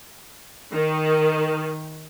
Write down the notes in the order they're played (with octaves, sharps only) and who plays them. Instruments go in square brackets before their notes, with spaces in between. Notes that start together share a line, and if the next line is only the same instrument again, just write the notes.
[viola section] D#3